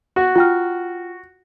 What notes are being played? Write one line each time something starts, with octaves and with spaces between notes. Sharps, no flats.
F#4
F4 G5 F6